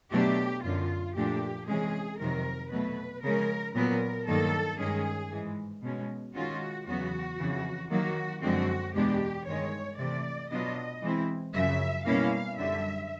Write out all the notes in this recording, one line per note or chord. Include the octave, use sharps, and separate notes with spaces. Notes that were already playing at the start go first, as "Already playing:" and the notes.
B2 F#3 A3 D4 G4
F#2 D3 F#3 F4
A#2 F3 A3 D4 G4
C3 E3 G#3 C#4 G#4
F2 C3 D#3 F#3 A#4
B2 F#3 A3 B4
C#3 F3 G#3 C#4 A#4
A#2 F#3 B3 A#4
G2 D#3 F#3 A#3 A4
G2 D#3 G#3 C#4 G#4
G#2 E3 G#3
B2 G#3 C#4
D#3 G#3 C#4 F4 F#4
E2 C#3 F#3 B3 F#4
F2 C#3 E3
D#3 F#3 A#3 F#4
F#2 D3 F3 G#3 C4 F#4
E2 B2 G#3 B3 D4 G4
G2 D#3 G#3 C#5
C3 E3 A3 D5
B2 F#3 B3 D4 F4 D#5
E3 G#3 C4 E4
F#2 C#3 F3 E5
B2 G3 A#3 C#4 E4 F5
F#2 D3 G3 E5